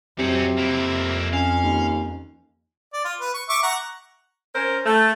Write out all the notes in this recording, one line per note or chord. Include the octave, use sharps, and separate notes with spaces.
F2 C3 F#3 C4 C#4
F2 A#3 E4
C#4 F5
D#2
D5
F4
B4
C#6
E5 C#6 D6
F#5 A#5 C#6
C#4 A#4 C5
A3